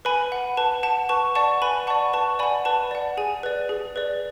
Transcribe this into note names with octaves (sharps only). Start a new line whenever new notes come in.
B4 G#5 B5
F#5
B4 A5
F#5 A5
B4 A5 C#6
D5 F#5 A5 C#6
B4 G#5 B5
D5 F#5 A5 C#6
B4 A5 C#6
D5 F#5 G#5 B5
B4 A5
D5 F#5
G#4 G#5
B4 D5
G#4
B4 D5